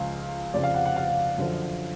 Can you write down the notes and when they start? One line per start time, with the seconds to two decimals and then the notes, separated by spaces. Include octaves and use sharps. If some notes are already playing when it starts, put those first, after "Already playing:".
Already playing: C#2 C#3 F3 F5
0.54 F2 C#3 F3 D5
0.63 F5
0.74 F#5
0.86 F#5
0.96 F5
1.38 F#2 D3 F3